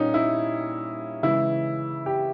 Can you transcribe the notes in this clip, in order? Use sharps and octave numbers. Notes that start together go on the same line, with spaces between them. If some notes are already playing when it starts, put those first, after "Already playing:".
Already playing: A#2 G3 A#3 C#4 D#4
E4
C#3 E3 G#3 E4
G4